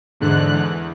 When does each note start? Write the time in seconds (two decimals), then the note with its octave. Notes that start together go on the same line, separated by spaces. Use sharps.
0.20 E2 G#2 D3 F#6
0.53 E2